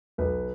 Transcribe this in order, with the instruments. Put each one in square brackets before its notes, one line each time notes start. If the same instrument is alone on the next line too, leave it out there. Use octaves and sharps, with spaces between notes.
[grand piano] B1 B4